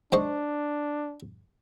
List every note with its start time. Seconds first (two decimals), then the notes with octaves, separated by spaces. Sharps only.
0.12 G#2 D4 C5 C#6